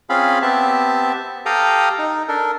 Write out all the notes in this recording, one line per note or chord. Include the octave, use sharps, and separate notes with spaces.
C4 C#4 F4 G#4 F5 B5
B3 C4 G4 E5 A5
G4 A4 F5 G5 A#5 D#6
D#4
D4 A4 A#4